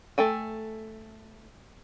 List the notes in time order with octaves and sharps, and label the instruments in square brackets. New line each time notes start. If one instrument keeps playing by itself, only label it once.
[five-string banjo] A3 A4 G5 G#5